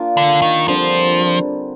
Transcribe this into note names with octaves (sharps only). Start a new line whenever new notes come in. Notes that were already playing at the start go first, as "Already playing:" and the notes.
Already playing: A#3 D4 F4
D3
D#3
D3 F3 G3 C4